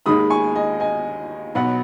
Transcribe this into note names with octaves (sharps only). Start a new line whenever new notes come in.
D#2 D#3 G#3 B5 D#6
G#5 C#6
D#5 G#5
D#5 G#5
B1 B2 F#3 B3 F#5 B5